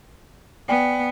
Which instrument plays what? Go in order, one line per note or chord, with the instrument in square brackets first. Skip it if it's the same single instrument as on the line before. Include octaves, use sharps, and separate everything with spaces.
[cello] B3 [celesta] D5 G5 G#5